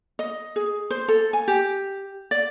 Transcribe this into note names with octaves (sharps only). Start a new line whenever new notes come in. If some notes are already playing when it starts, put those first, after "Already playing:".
D#5
G#4
C5
A4
G#5
G4
D5